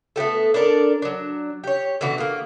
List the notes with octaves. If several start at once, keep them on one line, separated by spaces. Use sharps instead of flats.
A3 B3 G4 A4
D4 A4 A#4 D5
F#3 D4
G4 C#5
B2 D3 E3 F#4
A#3 G#4